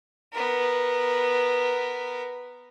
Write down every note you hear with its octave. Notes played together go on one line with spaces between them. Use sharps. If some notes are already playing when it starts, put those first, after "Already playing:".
B3 A#4